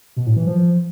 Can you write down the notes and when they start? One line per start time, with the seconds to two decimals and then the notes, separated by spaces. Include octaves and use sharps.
0.16 B2
0.26 A2
0.36 E3
0.46 F3